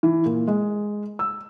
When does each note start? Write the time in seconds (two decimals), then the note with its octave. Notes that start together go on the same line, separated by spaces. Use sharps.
0.03 E3
0.25 A#2
0.48 G#3
1.19 E6